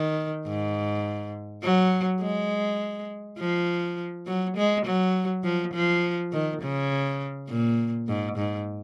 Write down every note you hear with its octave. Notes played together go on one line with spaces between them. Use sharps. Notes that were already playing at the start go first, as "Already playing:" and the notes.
Already playing: D#3
G#2
F#3
G#3
F3
F#3
G#3
F#3
F3
F3
D#3
C#3
A#2
G#2
G#2